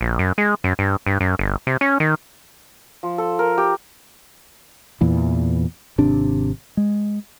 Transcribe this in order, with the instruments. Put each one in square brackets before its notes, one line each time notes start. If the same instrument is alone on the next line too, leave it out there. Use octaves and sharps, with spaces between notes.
[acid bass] A#1
F#2
G#3
F#2
G2
G2
F#2
G1
C3
C#4
D#3
[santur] F3
A4
A#4
G4
[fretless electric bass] E2 A#2 E3
G#1 C3 D4
G#3